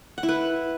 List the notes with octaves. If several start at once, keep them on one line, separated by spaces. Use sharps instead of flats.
F#5
E4
B4